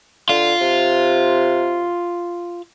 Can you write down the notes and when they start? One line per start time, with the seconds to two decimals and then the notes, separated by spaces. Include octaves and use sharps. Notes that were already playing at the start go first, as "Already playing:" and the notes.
0.29 D3 F4
0.61 C3